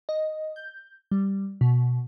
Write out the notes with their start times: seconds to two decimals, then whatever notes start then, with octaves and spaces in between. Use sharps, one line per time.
0.09 D#5
0.56 G6
1.11 G3
1.61 B2